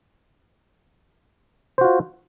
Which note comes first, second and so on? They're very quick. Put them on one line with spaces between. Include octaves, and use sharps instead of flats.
C5 F#4 F4